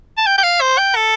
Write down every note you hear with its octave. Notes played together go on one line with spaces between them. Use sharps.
A5
G5
G5
F5
C5
G5
A4